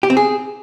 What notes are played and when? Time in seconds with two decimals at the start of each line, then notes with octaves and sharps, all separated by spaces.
0.03 G4
0.10 C4
0.17 G#4